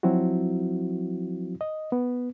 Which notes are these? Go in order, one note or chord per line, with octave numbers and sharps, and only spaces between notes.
F3 F#3 C4 E4 F#4
D#5
B3